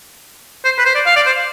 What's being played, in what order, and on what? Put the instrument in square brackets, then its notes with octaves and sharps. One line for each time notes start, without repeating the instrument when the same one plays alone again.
[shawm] C5
B4
C5
D5
F5
D5
C5